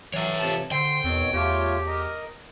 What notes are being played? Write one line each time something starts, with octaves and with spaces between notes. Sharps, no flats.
E3 F#3 C#5 E5
C3 F3 A5
D3 C5 G5 C6
E2 B2 D#3 C4 C#5
E2 A3 F4 G4 C#5
A#4 D#5